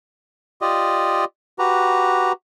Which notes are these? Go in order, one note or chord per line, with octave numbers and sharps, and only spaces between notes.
F4 G4 D5 D#5
F#4 G4 B4 A#5